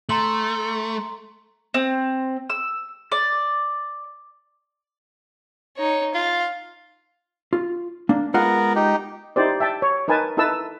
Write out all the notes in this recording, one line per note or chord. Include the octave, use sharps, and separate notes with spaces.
A3 A#5 C6 F#7
C4
E6
D5
D#4 C#5
F4 F5
F4
A#3 D4
G#3 B3 F4 A#4 F#5
D#4 G4
D#4 E4 G4 C5 D5
E5 G5 A5
C#5
D#4 A#4 B4 G#5 A5
D#4 E4 A4 B4 A5 E6